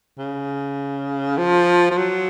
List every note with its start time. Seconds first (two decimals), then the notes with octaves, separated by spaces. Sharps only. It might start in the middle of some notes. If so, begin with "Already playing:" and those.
0.18 C#3
1.38 F3
1.91 F3
1.97 F#3